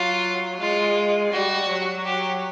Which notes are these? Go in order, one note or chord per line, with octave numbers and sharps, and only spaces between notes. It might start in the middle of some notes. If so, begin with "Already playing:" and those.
Already playing: F#3 F4
G#3 F4
G3 F#4
F#3
G4